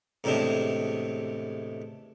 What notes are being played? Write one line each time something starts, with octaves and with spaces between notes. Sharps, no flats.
E2 A2 C3 G#3 D4